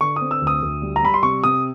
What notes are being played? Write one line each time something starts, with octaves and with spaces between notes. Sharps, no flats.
D3 C#6
C4 D#6
E6
D2
D#6
D2
G3
A#5
G3 B5
C6
C3 C#6
C3 D#6